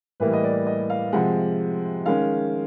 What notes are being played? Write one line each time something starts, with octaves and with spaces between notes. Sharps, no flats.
A2 E3 G3 A#3 B4
D#5
D5
D#5
F5
C3 F3 G#3 F#5
D#3 G#3 C#4 F5